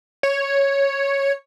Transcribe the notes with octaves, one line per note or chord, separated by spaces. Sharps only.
C#5